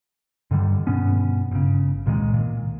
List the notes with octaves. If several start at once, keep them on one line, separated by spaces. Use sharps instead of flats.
G2 D3 D#3 G3
G2 B2 B3 C#4
G1 C#3
C2 A#2 D#3 G#3
A#2